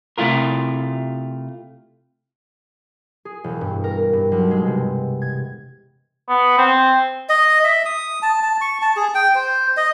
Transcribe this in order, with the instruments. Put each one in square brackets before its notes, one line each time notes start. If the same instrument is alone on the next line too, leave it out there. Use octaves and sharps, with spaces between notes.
[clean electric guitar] C3 A3 E4 F4 A#4
[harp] G#4
E1
G2
A#4
G2
B1
G#3
C3
G#6
[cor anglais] B3
C4
[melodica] D#5
E5
D#6
A5
A5
C#6
A5
G#4
G5
C5
D#5